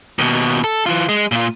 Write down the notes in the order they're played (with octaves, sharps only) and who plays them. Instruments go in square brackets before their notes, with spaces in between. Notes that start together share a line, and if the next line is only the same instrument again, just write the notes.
[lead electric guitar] D#2 B2
A4
E3 F4
G#3
A#2 F4